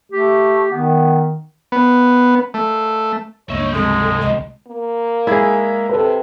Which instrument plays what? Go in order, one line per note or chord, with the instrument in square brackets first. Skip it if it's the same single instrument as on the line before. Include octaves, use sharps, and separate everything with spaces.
[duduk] A3 [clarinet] G4
[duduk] D#3 [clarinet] B3
[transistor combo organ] B3
A3
[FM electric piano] C#2 G2 [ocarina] A#3 [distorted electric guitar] D#4 E5 [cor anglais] C#5
[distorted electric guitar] G#2 C3 [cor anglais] G#3 [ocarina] A4
[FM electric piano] C#2 [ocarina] D#5
[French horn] A#3
[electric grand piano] G#3 E5 G#6 [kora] E4 G#4
[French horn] C3 [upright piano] A4 B4